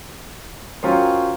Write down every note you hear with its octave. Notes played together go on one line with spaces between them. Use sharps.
D#3 F#3 C#4 F4 C5